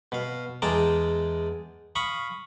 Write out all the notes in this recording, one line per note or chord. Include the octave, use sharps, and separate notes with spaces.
B2 F5
E2 G#3 G5 A5 A#5 D6
F5 B5 C#6 D#6